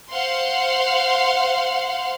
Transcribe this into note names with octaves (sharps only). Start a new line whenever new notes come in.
C5 F5 F#5 C6